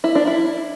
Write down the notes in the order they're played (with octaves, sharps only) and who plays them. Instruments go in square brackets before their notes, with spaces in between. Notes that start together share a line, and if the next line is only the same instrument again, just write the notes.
[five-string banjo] E4
D4
E4